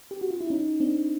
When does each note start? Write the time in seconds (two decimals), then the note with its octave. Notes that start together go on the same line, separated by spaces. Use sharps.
0.11 G4
0.21 F#4
0.31 F4
0.41 E4
0.50 C#4 D#4
0.80 C4 D4